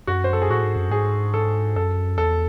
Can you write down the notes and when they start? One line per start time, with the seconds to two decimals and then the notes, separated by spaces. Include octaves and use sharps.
0.07 F#2 F#4
0.24 C5
0.33 A4
0.42 G#4
0.50 A2 F#4
0.63 G#2
0.76 F#2
0.90 G#2 G#4
1.34 A4
1.76 F#2 A4
2.18 E2 A4